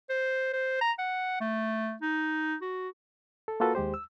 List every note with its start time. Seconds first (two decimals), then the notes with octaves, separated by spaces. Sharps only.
0.10 C5
0.53 C5
0.81 A#5
0.99 F#5
1.41 A3
2.02 D#4
2.62 F#4
3.48 A4
3.60 A#3 F4 F#4 A4 B4
3.75 D#2 G#3 G4 C5
3.94 E6